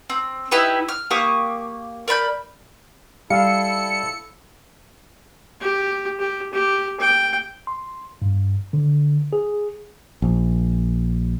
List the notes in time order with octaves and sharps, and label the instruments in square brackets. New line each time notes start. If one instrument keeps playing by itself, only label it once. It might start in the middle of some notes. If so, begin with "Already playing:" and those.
[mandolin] C4
D#4 E4 G4 B4
F6
A#3 G4 C#6 D#6
A#4 D5 B5 G6
[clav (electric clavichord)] G3 [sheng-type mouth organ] E4 A4 [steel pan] F5 [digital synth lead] C#7
[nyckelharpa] G4
G4
G4
G5
[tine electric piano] C6
G2
D3
G#4
[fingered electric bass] A#1